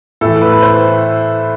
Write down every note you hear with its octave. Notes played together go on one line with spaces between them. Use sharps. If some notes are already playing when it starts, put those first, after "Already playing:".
A2 E3 A4
B4
B4
C5